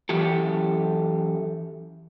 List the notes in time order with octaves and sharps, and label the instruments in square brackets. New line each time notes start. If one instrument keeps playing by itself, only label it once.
[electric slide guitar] F#2 E3 G4 A4